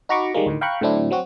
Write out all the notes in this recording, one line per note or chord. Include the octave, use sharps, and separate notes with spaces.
D#4 F#4 A#5 B5 C#6 D6
D#3 G3 G#3 A#3
D2 A2 D#3
F5 G5 A#5 B5 C#6 F#6
A2 D3 F#3 C4 D4 E4
F#3 C4 F#4